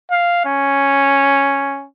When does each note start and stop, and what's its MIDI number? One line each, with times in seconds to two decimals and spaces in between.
0.11 0.44 77
0.45 1.86 61